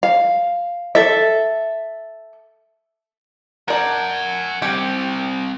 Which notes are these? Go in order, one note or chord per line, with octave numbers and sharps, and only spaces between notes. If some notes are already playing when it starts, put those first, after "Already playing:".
F5
A4 E5
A#4 D5 F#5 G#5 A5
G3 C4 G4